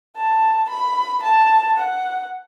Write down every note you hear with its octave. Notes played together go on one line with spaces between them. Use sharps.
A5
B5
A5
F#5